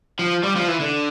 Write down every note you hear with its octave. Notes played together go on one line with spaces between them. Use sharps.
F3
G3
F3
E3
D3